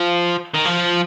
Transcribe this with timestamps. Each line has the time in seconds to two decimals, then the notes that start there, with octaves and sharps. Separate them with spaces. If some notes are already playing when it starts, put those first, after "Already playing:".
Already playing: F3
0.54 D#3
0.65 F3